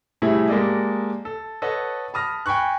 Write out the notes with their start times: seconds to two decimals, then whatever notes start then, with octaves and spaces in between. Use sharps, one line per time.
0.22 A2 C3 G3 A3 E4 G#4
0.49 G#3 A#3 G4 A4 D5 D#5
1.25 A4
1.62 A4 B4 C#5 D#5 F#5
2.14 A5 B5 D#6 F6 A#6
2.46 G5 G#5 B5 C#6 F#6